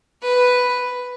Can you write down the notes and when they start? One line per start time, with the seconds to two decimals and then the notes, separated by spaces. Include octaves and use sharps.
0.22 B4